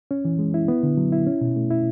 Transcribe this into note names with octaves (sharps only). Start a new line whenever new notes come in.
C#4
E3
G#3
E4
B3
D3
F#3
E4
C#4
B2
A3
E4